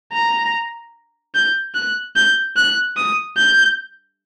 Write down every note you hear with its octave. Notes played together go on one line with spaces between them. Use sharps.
A#5
G6
F#6
G6
F#6
D#6
G6